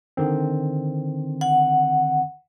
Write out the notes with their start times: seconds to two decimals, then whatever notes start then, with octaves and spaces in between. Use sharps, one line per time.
0.17 D3 D#3 C4
1.41 F#5